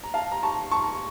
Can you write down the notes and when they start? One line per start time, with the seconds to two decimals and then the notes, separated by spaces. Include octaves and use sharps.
0.04 A#5
0.14 F5 A5
0.32 A#5
0.43 A5 C#6
0.71 A5 C#6